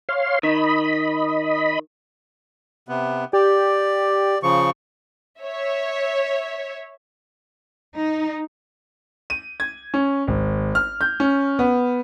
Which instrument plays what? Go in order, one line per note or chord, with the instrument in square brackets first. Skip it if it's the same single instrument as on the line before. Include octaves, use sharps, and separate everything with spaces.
[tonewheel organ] C#5 F5 C6
[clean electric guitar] D#3 [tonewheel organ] D#5 B5
[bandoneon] C3 B3
[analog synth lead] G4 [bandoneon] D5
[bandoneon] C#3 F3 C#6
[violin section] C#5 E5
[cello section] D#4
[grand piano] D#7
G#6
C#4
G#1
F6
G6
C#4
B3